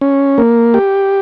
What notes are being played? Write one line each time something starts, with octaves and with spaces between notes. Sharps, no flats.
C#4
A#3
G4